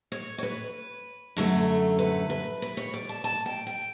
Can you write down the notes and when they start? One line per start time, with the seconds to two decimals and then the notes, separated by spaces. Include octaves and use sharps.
0.12 C#5
0.38 C#5
0.43 B4
1.37 F#2 D3 F#3 A3
1.99 B4
2.30 B4
2.62 B4
2.77 C#5
2.94 D5
3.09 A5
3.24 A5
3.46 G5
3.67 G5